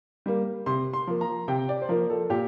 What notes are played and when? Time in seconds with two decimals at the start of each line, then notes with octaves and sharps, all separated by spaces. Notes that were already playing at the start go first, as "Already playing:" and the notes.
0.26 G3 A#3
0.66 C3 C6
0.93 C6
1.07 F3 A#3
1.21 A#5
1.48 C3 G5
1.69 D5
1.82 C5
1.89 F3 A#3 A#4
2.10 A4
2.30 A#2 G4